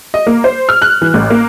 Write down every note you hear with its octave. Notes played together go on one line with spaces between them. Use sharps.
D#5
A#3
C5
F6
F#6
E3
A1
A#3